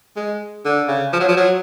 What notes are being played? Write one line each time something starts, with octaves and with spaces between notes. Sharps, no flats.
G#3
D3
C#3
F3
F#3
F3
F#3